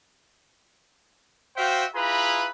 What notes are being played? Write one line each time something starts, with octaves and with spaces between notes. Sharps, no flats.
F#4 C5 E5 F5 G5
E4 F4 G#4 B4 A#5 B5